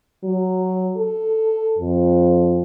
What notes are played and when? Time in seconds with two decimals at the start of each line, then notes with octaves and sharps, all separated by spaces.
0.24 F#3
0.97 A4
1.79 F2